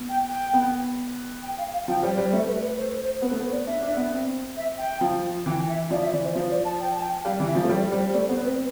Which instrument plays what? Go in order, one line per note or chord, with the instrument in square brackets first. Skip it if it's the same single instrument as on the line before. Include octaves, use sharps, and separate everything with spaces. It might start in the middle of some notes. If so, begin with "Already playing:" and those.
Already playing: [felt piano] B3
[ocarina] G5
G5
[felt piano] B3
[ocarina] G5
F5
F5
[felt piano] F3 [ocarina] G5
[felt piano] G3 [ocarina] C5
[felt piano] G3 [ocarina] C5
[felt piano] A3 [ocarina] E5
[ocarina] B4
B4
C5
C5
[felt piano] B3 [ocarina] B4
[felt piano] A3
[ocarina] C5
[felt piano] B3
[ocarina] D5
[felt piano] D4 [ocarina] E5
[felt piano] D4
B3
C4
[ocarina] E5
G5
[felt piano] F3
[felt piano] E3 [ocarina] G5
[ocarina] E5
[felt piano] F3 [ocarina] D5
[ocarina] E5
[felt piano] E3 [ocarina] D5
[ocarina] C5
[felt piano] F3 [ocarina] C5
[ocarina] D5
A5
G5
A5
G5
[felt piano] G3 [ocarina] F5
[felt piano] E3
[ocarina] E5
[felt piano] F3
[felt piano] A3 [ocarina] C5
[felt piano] G3 [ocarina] D5
[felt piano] G3 [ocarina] C5
[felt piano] A3 [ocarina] D5
[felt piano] B3 [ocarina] C5
[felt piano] C4 [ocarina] B4